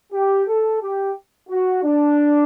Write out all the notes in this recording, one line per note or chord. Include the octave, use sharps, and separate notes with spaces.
G4
A4
G4
F#4
D4